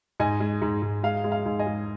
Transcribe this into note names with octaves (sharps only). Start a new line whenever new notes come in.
G#2 D#5 G#5
G#3
G#2
G#2
G#3 F5
G#3
F5
G#2
D#5 G#5
G#3